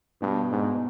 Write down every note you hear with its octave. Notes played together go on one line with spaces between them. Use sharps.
G2 B2
G#2 B2